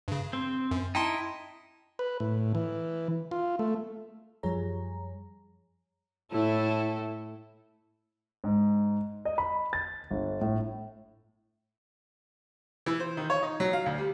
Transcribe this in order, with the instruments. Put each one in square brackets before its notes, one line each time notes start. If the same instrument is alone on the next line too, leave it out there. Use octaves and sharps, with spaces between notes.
[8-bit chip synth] G2 C#3
[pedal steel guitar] C4
[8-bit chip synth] F#2
[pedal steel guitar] D#4 E4 [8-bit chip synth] G5 A5 C6
[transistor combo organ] B4
A2
E3
F4
A3
[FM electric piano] F#2 F3 G3 G#4 C#5 A#5
[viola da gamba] A2 E4 A4
[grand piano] G#2
D#5
B5
A6
G1
A2
[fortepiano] E3
C5
D#3
C#5
D#4
F#3
F5
D2
G3